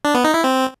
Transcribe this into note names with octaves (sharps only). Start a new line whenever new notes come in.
D4
B3
D#4
E4
C4